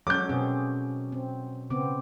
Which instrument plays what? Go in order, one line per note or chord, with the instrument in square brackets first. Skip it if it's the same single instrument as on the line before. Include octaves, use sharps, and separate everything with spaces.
[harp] F#3 C#4 [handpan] G#3 A4 C#5 [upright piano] D6 G6
[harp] B2 [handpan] C4 G#4
[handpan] C4
[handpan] C#3 B3 C4 [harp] D6